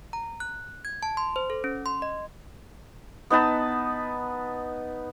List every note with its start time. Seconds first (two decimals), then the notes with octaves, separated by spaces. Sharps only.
0.13 A#5
0.40 F#6
0.85 G#6
1.03 A5
1.17 C6
1.36 C5
1.50 A4
1.64 C#4
1.86 C6
2.02 D#5
3.30 B3 D#4 B4 A5